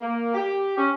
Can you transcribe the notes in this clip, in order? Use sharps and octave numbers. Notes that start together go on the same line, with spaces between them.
A#3
G4
C#4